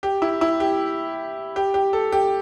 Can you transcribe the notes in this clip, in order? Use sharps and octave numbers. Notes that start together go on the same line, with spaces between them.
G4
E4
E4
G4
G4
G4
A4
G4